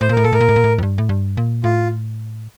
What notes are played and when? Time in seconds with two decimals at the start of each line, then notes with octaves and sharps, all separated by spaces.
0.01 A2 C5
0.09 A#2
0.12 A2 A#4
0.23 A#2 A4
0.33 A2 A#4
0.41 A#2
0.49 A2
0.56 A#2
0.64 A2
0.78 F2
0.83 G2
0.98 A2
1.09 G2
1.37 A#2
1.64 A2 F4